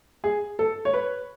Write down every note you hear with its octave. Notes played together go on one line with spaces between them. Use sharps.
G#4
A4
C#5
B4